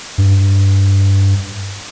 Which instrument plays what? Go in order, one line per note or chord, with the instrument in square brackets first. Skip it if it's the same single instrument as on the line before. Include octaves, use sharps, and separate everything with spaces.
[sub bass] G2